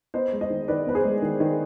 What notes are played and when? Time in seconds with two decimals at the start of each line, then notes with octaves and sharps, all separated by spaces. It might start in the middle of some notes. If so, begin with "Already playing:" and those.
0.14 B3 C5 D#5
0.32 G#3
0.41 C5 D#5
0.50 D#3
0.68 D#3 B4 D5
0.86 B3 B4
0.95 G#4 C5
1.04 G#3
1.22 D#3
1.40 D#3